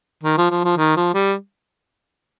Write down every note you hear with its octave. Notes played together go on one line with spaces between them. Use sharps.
D#3
F3
F3
F3
D#3
F3
G3